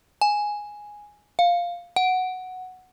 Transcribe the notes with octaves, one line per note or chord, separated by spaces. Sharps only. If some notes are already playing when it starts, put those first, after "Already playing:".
G#5
F5
F#5